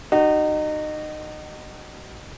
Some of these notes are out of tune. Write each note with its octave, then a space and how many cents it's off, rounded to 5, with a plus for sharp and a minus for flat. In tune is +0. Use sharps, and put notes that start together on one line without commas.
D#4 -25 F#4 +35